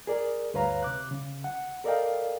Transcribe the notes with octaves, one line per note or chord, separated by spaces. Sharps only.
G#4 A#4 D5
D2 G2 B4 C#5 F5 A#5
C3 D6 F#6
C#3
F#5
A4 A#4 D5 D#5 F5 G5